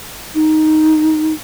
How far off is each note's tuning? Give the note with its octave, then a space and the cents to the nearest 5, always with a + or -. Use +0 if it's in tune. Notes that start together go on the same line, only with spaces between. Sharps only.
D#4 +0